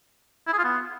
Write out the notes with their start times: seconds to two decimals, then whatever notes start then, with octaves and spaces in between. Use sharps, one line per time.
0.47 E4
0.53 G#4
0.59 F4
0.64 B3